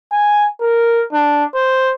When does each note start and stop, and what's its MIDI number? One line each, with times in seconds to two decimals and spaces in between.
0.12 0.47 80
0.61 1.04 70
1.13 1.44 62
1.54 1.94 72